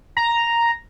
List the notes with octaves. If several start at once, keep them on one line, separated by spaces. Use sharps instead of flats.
A#5